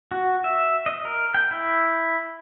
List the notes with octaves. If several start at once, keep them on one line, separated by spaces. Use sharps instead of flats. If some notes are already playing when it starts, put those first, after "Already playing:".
F#4
E5
D#5
A#4
G5
E4